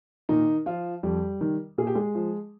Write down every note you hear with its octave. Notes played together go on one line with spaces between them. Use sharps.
A#2 D#3 D#4
F3 F4
F2 G3 G4
D#3
A#2 G#4
G4
G#3 G#4
F3